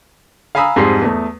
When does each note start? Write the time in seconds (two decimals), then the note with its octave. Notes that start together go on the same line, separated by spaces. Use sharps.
0.55 F5 G#5 A#5 B5 D#6 E6
0.76 F2 G#2 G3 G#4 C6 C7
1.02 E2 A3